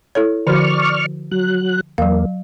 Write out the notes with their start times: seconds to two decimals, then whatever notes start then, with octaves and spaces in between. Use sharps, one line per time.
0.15 E4 A4 C#5
0.47 D3 F3 F#4 D5 C#6 F6
1.31 F#3 F#6
1.98 E2 F#3 A#3 F5